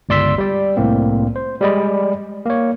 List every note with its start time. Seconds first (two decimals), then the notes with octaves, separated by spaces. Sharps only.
0.09 G1 C#2 D5 C6 E6 B6
0.38 G3 D5
0.77 C2 A2 A#3 C4
1.36 C5
1.61 G3 G#3 D5 D#5 B5
2.45 A#3 C#5